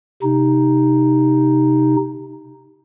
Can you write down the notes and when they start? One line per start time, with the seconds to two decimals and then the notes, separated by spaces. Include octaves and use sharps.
0.22 C3 D#4